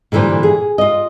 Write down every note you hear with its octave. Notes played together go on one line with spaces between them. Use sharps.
A#2 D3 E3 G3 C5
G#4
F4 D#5